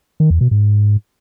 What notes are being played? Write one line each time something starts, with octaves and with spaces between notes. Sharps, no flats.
D#3
E2
B2
G#2